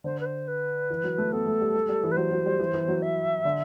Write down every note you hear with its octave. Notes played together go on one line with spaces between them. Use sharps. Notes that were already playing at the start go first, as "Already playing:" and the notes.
D3 C5
B4
C5
B4
E3
F#3
A3
B3 A4
A3
G3
G3
G3
E3
B4
F#3 C5
F#3
G3
E3
E3
F#3
E5
D3